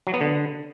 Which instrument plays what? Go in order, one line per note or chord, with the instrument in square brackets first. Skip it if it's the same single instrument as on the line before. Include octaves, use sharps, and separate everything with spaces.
[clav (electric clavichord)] F#3
B3
D3